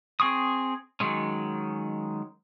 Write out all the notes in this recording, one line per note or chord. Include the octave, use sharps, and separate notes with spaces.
C4 G#4 C#6 D#6
D#3 F#3 G#3 C#4